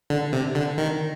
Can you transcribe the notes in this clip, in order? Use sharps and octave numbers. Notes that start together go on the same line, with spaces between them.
D3
C3
D3
D#3